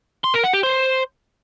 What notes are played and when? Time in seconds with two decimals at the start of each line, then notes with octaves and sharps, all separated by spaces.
0.24 C6
0.34 A#4
0.44 F#5
0.53 G4
0.63 C5